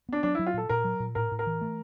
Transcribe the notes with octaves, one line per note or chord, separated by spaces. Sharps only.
B3 D4
F#3 D4
E4
F#3
F4
A#2 A4
A#2 A#4
F#3
A#2
A2 A#4
A2
A#4
E3
A3